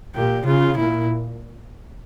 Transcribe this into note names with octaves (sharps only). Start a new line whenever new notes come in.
A#2 G4
C#3 F4
A#2 E4